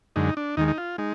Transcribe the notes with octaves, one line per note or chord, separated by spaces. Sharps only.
F#2 D3 G#3 D#4
D4
D#2 D#3 G#3 D#4
D#4
F4
G#3 D#4